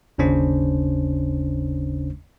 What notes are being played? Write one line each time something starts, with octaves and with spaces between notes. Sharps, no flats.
G1 D#2 C#3 C#4 D4 C5